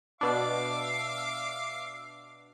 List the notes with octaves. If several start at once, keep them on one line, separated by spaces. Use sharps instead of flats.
B2 D4 E5 F5 D6